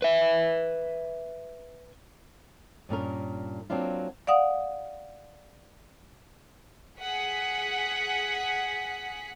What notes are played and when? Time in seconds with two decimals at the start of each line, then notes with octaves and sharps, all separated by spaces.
0.02 B4 E5
2.89 G2 A#2 C#4 A#4
3.70 F#3 A#3 C4 D4 F4
4.27 D5 F5 F#5 D#6
6.98 G#4 F#5 B6